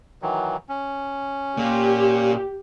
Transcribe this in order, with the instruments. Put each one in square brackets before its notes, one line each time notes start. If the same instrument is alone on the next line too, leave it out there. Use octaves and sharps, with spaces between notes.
[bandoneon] D#3 E3 F#3
C#4
[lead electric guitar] A#2 A#3 [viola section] G4